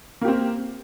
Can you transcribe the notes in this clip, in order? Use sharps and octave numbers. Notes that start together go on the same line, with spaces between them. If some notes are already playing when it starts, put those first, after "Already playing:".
A#3 C4 G4